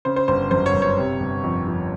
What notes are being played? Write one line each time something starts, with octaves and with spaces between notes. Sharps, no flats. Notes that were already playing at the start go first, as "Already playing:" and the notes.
C#3 C5
C5
G1 C5
F#2 C5
C#5
G1
C#5
C3
G1
F2
F3